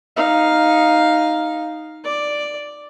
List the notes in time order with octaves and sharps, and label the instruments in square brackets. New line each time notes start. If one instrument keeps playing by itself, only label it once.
[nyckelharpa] D#4 F5
D5